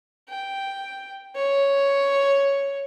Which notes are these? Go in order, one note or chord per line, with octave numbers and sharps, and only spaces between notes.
G5
C#5